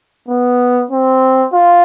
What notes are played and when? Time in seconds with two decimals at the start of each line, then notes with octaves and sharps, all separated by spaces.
0.28 B3
0.91 C4
1.53 F4